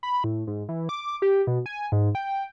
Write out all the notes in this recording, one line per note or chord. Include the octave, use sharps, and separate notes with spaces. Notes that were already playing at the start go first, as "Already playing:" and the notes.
B5
A2
G#2
E3
D6
G4
B2
G#5
G#2
G5